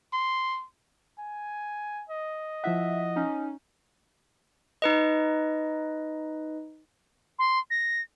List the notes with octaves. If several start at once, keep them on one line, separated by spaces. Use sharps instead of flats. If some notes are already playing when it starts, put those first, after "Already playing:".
C6
G#5
D#5
F3 E4 E5 F#5
C#4 D#4
D#4 B4 D#5
C6
A#6